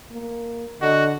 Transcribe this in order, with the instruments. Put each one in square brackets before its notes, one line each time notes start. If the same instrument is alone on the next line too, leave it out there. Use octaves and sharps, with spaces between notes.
[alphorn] A#3
[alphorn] D3 [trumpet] F#4 [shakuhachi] D#5